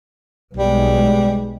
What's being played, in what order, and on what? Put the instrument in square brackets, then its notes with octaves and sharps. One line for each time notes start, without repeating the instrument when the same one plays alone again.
[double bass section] B1 G#3 [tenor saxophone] G3